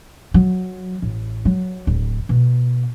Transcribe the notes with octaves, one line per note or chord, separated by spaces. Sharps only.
F#3
A1
F#3
D1
B2